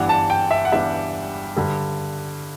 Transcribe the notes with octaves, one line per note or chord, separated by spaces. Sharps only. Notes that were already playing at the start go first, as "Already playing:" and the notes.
Already playing: G1 G2 E3 G3 D4 F#5
A5
G5
E5
F#5
G1 G2 E3 G3 D4 E5
G2 D3 G3